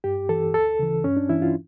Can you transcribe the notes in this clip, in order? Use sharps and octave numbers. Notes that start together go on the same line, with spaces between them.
G2 G4
E3 A4
D2 A4
C#3 E3
G2 C#4
D4
E3 E4
F4